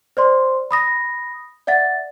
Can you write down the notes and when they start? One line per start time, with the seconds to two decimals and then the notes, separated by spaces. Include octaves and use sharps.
0.17 C5 D5 C6
0.71 B5 D#6 A#6
1.67 D5 E5 F#5 A6